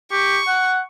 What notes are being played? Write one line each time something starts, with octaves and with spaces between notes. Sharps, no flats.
G4 C#6
F#5